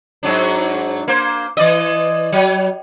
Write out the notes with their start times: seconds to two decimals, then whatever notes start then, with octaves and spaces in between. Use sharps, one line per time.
0.23 G#2 F#3 D4
1.08 A#3 C5
1.57 E3 D5 D#5
2.32 F#3